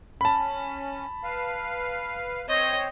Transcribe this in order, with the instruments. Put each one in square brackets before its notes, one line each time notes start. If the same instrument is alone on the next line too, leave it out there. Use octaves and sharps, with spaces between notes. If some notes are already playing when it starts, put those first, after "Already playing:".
[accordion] C#4 [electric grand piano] A5 B5
[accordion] B4 F5
[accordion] C4 C5 C#5 [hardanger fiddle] D#5